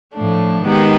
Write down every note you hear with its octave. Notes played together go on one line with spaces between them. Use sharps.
A2 F3 A3 D4
D#3 G#3 B3 D#4 G4